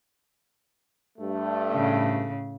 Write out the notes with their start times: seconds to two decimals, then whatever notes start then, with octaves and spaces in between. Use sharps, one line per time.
1.18 G2 A3
1.72 A2 C#3